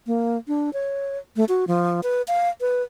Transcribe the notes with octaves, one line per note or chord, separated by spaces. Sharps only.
A#3
D4
C#5
A3
F#4
F3
B4
F5
B4